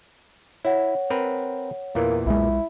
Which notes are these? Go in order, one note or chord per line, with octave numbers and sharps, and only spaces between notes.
E4 C#5 F#5
C4 A#4 B4
E2 A#2 E3 A#3
B1 G#3 E4